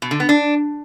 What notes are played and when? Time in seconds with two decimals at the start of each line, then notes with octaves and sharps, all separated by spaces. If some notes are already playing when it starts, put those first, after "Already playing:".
0.02 B2
0.11 D3
0.20 B3
0.29 D4